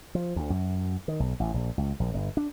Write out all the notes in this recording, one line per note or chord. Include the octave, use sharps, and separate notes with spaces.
F3
D2
F#2
D#3
B1
A1
A#1
C#2
A#1
G1
D4